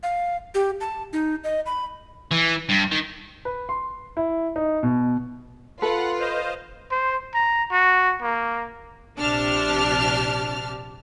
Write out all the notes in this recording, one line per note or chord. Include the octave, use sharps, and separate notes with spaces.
F5
G4
A5
D#4
D#5
B5
E3
G2
D#3
B4
C6
E4
D#4
B2
F4 A4 B4 F#5 F#6
C5 D#5 F5
C5
A#5
F#4
A#3
A#1 C3 D4 G4 A5 F6